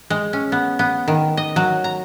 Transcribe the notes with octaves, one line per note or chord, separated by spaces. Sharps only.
G#3
C#4
B3
B3
D#3
D#5
F#3
A#5